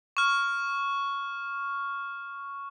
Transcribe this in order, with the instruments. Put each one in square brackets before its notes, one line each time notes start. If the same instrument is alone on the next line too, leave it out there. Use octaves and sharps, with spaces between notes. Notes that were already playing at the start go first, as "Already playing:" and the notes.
[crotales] C#6 F6